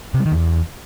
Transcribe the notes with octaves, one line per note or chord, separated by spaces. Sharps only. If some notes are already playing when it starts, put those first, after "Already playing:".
C3
G3
D#3
E2